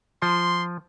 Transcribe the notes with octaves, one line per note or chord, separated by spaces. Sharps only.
F3 C6